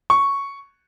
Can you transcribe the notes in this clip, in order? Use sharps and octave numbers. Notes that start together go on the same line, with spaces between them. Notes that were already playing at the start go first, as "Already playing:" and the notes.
C#6